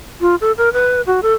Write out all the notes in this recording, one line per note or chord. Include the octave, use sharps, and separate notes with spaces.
F4
A4
A#4
B4
F#4
A4